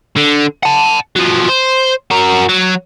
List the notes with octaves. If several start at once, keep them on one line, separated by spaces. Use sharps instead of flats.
D3
F#5 A5
F3 F#3
C5
F#4 A#4
F#3